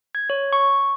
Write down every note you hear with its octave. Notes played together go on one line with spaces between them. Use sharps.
G#6
C#5
C#6